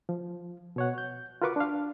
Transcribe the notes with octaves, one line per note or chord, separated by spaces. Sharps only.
F3
B2 C#5 F#5
G6
F4 F#4 A#4 B4 C#6 D6
D4 F5